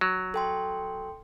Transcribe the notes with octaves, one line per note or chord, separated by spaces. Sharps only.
F#3
A4 G5 C6